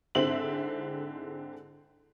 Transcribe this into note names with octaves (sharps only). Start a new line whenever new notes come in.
G#2 D3 C4 E4 E5 F#7